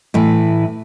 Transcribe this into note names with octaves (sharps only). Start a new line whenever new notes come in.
A2 E3